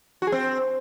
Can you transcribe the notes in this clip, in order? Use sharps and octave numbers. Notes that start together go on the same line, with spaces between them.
F#4
G#4
C4